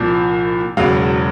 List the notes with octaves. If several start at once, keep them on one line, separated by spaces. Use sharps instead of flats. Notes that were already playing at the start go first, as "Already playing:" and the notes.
Already playing: C2 A#2 F3
E1 E2 C#3 F#3 F5